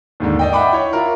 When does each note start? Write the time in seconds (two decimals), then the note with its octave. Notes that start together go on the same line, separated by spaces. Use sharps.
0.20 D#2 G#2 D3
0.39 D5 D#5 G5
0.53 E5 F#5 G5 B5 D6
0.73 E4 C#5
0.93 E4 F4 A#4